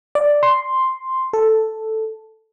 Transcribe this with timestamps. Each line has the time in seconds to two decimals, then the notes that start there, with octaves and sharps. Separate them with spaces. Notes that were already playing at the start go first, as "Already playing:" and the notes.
0.15 D5
0.43 C6
1.33 A4